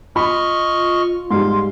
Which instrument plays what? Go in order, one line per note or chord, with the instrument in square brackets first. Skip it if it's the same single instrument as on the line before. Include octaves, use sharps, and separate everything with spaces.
[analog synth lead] F4 [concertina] D#5 C#6 F6 [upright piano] B5
[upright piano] G#2 G3 [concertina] F5 [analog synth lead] C6